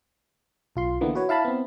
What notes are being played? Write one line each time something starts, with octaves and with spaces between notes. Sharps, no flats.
B1 F4 C6
D3 E3 A#3 B3
F#4 B4 C#5
E4 F5 A5 B5
B3 C4